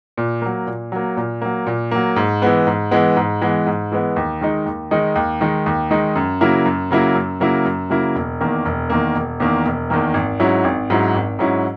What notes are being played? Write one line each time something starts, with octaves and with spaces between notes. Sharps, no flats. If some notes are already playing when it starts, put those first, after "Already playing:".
A#2
F#3 A#3
A#2
F#3 A#3
A#2
F#3 A#3
A#2
F#3 A#3
G#2
E3 G#3 B3
G#2
E3 G#3 B3
G#2
E3 G#3 B3
G#2
E3 G#3 B3
D#2
D#3 G#3 D#4
D#2
D#3 G#3 D#4
D#2
D#3 G#3 D#4
D#2
D#3 G#3 D#4
F#2
C#3 F#3 A#3 E4
F#2
C#3 F#3 A#3 E4
F#2
C#3 F#3 A#3 E4
F#2
C#3 F#3 A#3 E4
E1
E2 D#3 A#3
E1
E2 D#3 A#3
E1
E2 D#3 A#3
E1
E2 D#3 A#3
G#1
G#2 F#3 C#4 E4
G#1
G#2 F#3 C#4 E4
G#1
G#2 F#3 C#4 E4